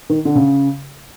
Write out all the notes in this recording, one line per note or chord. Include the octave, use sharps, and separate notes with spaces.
D#3
D3
C#3